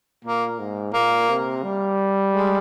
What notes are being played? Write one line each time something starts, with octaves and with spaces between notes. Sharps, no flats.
A#2 A#3
G#2
A#2 A#3
C3
G3
G#3